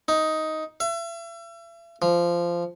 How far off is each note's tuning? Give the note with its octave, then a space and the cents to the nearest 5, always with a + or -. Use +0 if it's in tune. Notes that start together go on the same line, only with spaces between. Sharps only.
D#4 +10
E5 +40
F3 -15